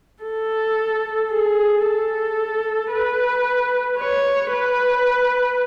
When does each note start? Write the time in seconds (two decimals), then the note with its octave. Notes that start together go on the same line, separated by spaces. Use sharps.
0.24 A4
1.31 G#4
1.85 A4
2.92 B4
4.00 C#5
4.53 B4